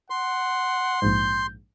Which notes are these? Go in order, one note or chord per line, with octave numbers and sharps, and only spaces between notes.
F#5 C6
A#1 G#2 G6